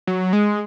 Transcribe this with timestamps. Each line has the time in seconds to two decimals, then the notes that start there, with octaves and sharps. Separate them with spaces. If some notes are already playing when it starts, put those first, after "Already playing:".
0.07 F#3
0.33 G#3